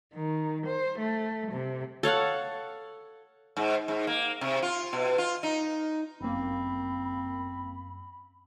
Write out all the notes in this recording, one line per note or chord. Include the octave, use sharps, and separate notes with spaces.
D#3
C5
A3
C3
A4 C#5 F5 F#5
G#2
G#2
A#3
C3
F4
B2
F4
D#4
G1 F#2 A#3 C4 B5